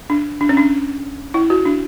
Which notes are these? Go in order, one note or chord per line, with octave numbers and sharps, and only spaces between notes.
D4
D4
C#4
D4
E4
F#4
D4